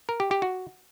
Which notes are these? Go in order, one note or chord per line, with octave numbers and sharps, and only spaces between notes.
A#4
G4
G4
F#4